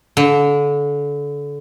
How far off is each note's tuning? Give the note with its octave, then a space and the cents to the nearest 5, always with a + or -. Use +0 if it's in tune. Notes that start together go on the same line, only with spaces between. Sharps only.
D3 -30